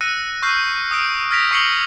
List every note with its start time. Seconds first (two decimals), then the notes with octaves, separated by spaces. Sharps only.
0.01 E6 F#6 A#6 C#7 D#7
0.42 C#6 E6 F6 G6 C7
0.91 D#6 E6 G6 D7
1.31 F6 G#6 A#6 B6 D7 F7
1.51 C#6 D#6 C7 C#7 F#7 G7